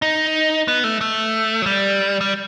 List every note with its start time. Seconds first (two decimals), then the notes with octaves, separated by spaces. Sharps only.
0.02 D#4
0.68 B3
0.84 A3
1.01 A3
1.62 F#3
1.66 G3
2.21 G3